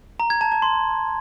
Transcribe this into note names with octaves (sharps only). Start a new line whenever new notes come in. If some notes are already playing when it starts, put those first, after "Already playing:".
A#5
G#6
A5
A5
C6